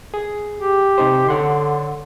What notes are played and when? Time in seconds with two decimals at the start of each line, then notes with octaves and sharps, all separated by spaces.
0.14 G#4
0.59 G4
0.98 C3 D#4 C5
1.28 D3 C#5 F#5 C6